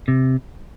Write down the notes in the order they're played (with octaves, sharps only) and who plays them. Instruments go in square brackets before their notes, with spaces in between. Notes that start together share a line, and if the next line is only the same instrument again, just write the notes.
[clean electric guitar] C3